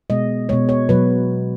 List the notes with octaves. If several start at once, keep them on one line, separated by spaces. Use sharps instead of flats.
B2 G#3 D#5
B2 G#3 C#5
C#5
B2 F#3 B4